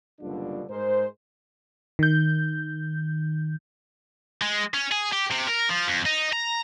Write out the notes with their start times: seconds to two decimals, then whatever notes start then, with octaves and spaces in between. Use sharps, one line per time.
0.20 F#1 B2 D3 G3 D4 F4
0.70 G#2 G#3 A#4 C5
1.99 D#3 G6
4.42 G#3
4.74 C#4
4.92 G#4
5.12 G4
5.31 C3
5.47 A#4
5.69 F3
5.87 F2
6.06 D#4
6.33 A#5